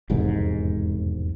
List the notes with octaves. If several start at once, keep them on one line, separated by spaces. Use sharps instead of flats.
E1 C2 F2 G#2